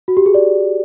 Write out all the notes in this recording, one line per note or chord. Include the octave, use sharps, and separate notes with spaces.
F#4
G4
G#4
D5